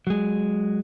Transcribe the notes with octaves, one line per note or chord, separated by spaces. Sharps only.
F#3 G#3